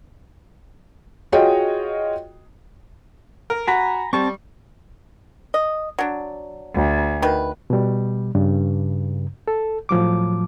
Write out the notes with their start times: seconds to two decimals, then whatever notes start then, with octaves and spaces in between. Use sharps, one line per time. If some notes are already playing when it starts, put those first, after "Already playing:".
1.32 F4 F#4 G#4 C#5 D#5 G5
3.50 A#4
3.68 F#4 G#5 A#5 B5
4.13 G3 C4 A5 C#6
5.54 D#5
5.99 F#3 D4
6.75 D2
7.22 D#3 B4
7.70 B2 G3
8.35 G2 C#3
9.48 A4
9.89 A2 F3 F#3 D6